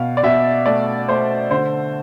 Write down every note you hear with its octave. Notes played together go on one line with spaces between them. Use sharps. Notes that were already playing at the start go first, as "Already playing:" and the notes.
Already playing: B2 F5
D5
B2 E5
A3 D5
A3 C5
D3 C5